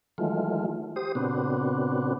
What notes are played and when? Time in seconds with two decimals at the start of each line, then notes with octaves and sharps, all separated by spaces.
0.18 D#3 E3 F#3 G#3 A3 F4
0.96 G4 C5 D#6
1.15 A#2 C#3 B3 C4 D4 F#4